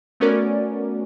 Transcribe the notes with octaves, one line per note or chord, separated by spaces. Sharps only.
A3 B3 C#4 F#4 A#4 D5